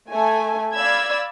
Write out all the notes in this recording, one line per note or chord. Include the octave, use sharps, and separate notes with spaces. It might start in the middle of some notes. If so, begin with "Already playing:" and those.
A3 G#5
D5 F5 B5 E6 G#6